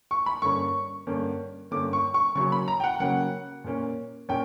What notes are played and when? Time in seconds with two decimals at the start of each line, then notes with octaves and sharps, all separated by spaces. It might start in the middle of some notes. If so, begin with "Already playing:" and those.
0.11 C#6
0.26 B5
0.42 G2 D3 A#3 C#4 C#6
1.07 G2 D3 A#3 C#4
1.71 G2 D3 A#3 C#4 D6
1.93 C#6
2.14 C#6
2.35 C#3 F#3 A#3 C#4 C#6
2.52 B5
2.68 A#5
2.80 G5
2.84 F#5
3.00 C#3 F#3 A#3 C#4 F#5
3.64 A#2 A#3 C#4
4.29 A#2 A#3 C#4 G5